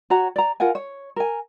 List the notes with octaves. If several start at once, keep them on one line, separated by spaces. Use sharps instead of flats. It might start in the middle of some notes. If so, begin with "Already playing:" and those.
F#4 C#5 A#5
D5 A#5
F4 A#4 F#5 G#5
C#5
A#4 G#5